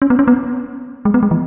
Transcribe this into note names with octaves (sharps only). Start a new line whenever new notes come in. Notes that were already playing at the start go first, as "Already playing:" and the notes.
C#4
B3
C#4
B3
G#3
B3
G#3
E3